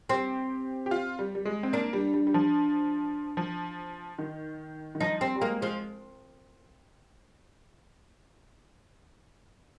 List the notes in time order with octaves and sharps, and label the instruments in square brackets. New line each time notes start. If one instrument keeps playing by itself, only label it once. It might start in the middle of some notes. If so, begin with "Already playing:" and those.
[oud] C4 [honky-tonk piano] G4
[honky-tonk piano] G4
F4
G3
G3
G#3
C4
[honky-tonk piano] A#3 [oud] D4
[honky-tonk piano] G3
G3
G3
F3
F3
D#3
D#3
[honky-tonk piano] F3 [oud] D#4
[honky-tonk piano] G3 [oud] C4
[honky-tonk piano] G3
[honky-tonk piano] G#3 [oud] A#3
[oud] F3 [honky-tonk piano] G#3